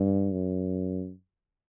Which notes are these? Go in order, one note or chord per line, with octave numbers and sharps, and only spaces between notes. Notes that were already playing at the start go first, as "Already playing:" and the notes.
Already playing: G2
F#2